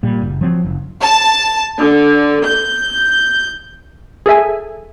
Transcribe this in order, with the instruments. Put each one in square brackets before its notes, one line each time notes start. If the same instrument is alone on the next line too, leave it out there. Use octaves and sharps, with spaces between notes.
[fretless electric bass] A#2 G3
F#1
F3 F#3 C4
F#1
[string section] A5
D3
G6
[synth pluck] G#4 A4 E5 G#5